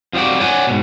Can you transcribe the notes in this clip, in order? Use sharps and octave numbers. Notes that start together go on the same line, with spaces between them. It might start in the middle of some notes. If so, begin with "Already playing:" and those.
F2 F3 G3 D#4 F#4 D5
C#5 D5 F#5 G#5
G#2 B2